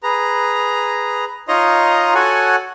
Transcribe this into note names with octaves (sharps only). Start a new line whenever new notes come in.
G#4 B4 A#5
D#4 F4 C#5 D#5 A#5 C6
F#4 A4 C#5 F#5 G#5